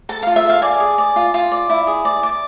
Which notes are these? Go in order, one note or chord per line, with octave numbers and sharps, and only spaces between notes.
A4 A5
F4 F5
E5
A4 F5
D5 G#5
G#4
D5
F4
F4
D5
E4
G#4
D5
D5